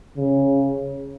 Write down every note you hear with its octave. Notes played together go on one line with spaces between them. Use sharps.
C#3